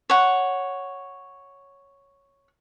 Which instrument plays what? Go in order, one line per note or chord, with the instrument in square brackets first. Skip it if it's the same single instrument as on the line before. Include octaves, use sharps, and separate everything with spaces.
[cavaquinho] C#5 F#5